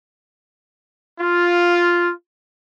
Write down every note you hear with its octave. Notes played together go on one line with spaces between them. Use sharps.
F4